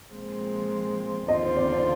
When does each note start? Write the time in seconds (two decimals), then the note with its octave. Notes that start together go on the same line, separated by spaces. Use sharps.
0.13 A#2 F3 G#3 C4
1.28 D#2 D3 F3 C4 F4 D#5
1.43 C5
1.57 D5
1.72 D5